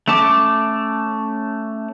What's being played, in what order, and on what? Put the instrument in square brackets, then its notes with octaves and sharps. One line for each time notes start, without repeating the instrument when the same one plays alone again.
[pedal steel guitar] A3 C#4 A5 D6